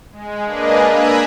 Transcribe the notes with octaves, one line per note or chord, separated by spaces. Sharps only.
G#3
A#3 D4 G#4 B4 D#5
G#5 A#5 B5 D#6 E6 F#6